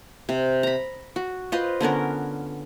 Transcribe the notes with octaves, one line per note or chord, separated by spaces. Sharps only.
C3
A#5 B5
F#4
F4 B4 C5 D#5
D3 B3 C#4 A#4